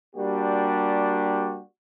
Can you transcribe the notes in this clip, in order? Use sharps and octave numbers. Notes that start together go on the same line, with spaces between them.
G3 A#3 D4 F#4 G4